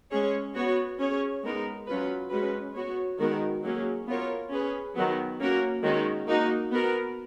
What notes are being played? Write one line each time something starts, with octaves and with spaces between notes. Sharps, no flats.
G#3 C#4 G#4 C#5
B3 F#4 C#5
C#4 G#4 C#5
G#3 B3 D#4 A#4
F#3 C#4 F4 B4
G#3 C#4 F#4 B4
B3 F#4 C#5
D#3 G#3 B3 F#4 A#4
F#3 A#3 C#4 G#4
B3 F4 A#4 C#5
C#4 G#4 B4
D#3 F#3 B3
A#3 C#4 F#4 A#4
D#3 G#3 C#4 F#4
A#3 D#4 F#4
B3 F#4 A#4